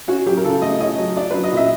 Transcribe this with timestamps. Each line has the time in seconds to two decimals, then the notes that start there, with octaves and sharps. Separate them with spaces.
0.08 C#4 F#4
0.26 F#3 G4
0.37 A#4
0.44 C#3 A4
0.62 A3 D#5
0.80 C#4 D#5
0.98 F#3
1.16 D4 D5
1.31 B4
1.34 F#3
1.44 D#5
1.53 A#2 E5